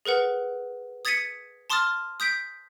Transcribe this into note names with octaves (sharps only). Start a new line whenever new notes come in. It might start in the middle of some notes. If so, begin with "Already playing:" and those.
G#4 A#4 B4 F#5
D#6 G#6 A6 B6 C#7 D#7
A5 C6 D6 D#6 F6 A6
D#6 G6 B6 D7